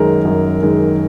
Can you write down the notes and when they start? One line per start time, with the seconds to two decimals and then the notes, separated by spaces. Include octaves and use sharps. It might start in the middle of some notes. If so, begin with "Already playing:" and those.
Already playing: F#2 D#3 G#3 A#4
0.25 F#2
0.62 D#3 G#3